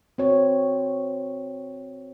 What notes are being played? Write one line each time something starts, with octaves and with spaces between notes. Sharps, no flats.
C4 F#4 C#5